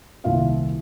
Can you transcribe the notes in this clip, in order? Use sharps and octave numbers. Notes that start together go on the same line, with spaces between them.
D#1 C2 A#2 F4 E5 F5